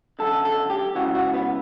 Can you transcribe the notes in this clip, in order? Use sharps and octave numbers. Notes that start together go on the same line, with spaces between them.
F#2 D3 A4
A4
G4
C#2 C#3 E3 F#4
F#4
B3